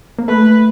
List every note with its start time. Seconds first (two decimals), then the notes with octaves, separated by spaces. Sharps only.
0.19 A#3
0.28 A3 B4